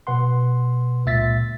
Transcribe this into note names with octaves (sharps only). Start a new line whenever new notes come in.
B2 B4 F#5 C6
C#2 A#2 E5 A6 B6